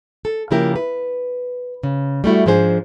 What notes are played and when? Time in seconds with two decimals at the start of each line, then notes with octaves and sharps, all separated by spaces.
0.25 A4
0.51 C#3 F3 A#3 E4 G4 A#4
0.76 B4
1.83 C#3
2.24 G3 A3 E4 F#4
2.46 G#2 F3 D4 G#4 C5